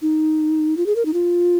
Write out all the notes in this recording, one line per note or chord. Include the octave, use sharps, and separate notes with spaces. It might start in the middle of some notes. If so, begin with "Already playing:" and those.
D#4
F4
G#4
A#4
D#4
F4